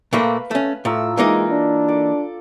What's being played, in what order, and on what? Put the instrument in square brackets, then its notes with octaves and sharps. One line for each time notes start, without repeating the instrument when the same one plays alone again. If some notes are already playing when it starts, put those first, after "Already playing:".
[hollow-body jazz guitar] A#2 A3 A#3 [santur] B4 F5
[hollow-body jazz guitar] A3 C#4
[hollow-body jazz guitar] A2 [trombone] A3 [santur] F4 A#5 E6
[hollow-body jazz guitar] E3 A#3 D#4 [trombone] G#3
[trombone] D4
[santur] A4 D5